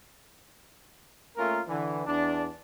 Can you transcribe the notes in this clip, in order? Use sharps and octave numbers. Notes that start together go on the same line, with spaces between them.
A3 A#3 C#4 F4 A#4
D3 E3
E2 D4